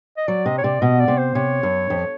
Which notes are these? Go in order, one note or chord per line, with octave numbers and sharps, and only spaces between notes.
D#5
F#3 D5
C3 D#5
C#5
C3 D5
B2 D#5
D5
C3
C5
C3 C#5
F#2
F2